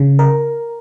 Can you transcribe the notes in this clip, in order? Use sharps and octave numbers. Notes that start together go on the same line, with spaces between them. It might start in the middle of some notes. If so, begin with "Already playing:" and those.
Already playing: C#3
A#4